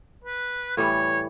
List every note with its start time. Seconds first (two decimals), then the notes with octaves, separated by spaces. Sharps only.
0.24 B4
0.77 A2 E3 G3 C#5